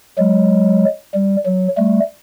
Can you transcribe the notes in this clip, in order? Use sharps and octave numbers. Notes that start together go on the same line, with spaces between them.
F#3 G#3
G3
F#3
G3 A3